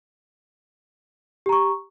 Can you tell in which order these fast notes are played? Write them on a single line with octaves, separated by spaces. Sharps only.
G4 A#5 C#6